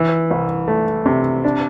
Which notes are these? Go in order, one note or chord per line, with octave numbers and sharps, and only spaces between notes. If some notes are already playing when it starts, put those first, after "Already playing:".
Already playing: E3
C2
A3
C3
D4